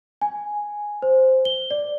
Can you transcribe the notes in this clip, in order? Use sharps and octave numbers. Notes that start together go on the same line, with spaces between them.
G#5
C5
G7
D5